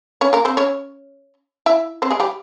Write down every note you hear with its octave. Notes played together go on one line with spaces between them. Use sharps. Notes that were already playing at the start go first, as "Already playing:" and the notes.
C#4 C#5
A#3 A#4
C4 C5
C#4 C#5
E4 E5
C4 C5
G#3 G#4
G3 G4